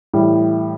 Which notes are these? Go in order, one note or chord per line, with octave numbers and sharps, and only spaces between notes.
A2 E3 G3